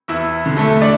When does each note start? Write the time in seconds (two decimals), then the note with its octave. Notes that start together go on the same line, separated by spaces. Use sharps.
0.08 E2 E4
0.46 D3
0.57 A3 A4
0.82 D4 D5